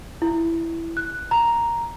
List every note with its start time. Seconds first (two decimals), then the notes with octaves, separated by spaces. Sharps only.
0.22 E4
0.97 F#6
1.31 A#5